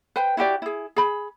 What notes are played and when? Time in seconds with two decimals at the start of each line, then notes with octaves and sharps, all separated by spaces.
0.16 B4 C5 G5
0.37 E4 F#4 G4 D5
0.62 E4 G#4
0.96 G#4 B5